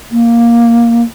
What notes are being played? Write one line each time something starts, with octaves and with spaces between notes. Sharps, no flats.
A#3